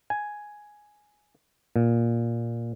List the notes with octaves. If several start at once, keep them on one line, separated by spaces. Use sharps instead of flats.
G#5
A#2